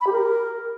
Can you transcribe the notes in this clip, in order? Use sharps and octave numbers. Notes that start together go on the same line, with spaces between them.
B5
G4
A#4